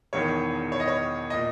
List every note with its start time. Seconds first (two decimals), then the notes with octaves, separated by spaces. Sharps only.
0.13 E1 E2 D#3 C#5
0.72 C#5
0.80 D#5
0.88 C#5
1.30 A#2 D#5